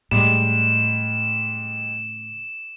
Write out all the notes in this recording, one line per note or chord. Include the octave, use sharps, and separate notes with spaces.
A2 C#3 G3 G#3 E7